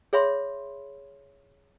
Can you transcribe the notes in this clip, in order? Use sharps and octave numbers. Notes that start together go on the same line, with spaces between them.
G#4 C#5 E5 B5 C6